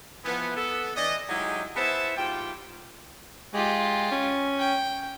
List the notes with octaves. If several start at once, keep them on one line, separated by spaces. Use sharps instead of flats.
E3 F3 A3 B3
B3 A4
E3 D5 D#5
F#3 G#3 D#4 E4 G4 G#4
B3 E4 G#4 C5 E5 A5
G#2 F4 G4 G5
G#3 F4 G4
C#4
G5